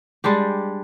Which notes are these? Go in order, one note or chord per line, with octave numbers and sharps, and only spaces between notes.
G3 G#3 D4 G4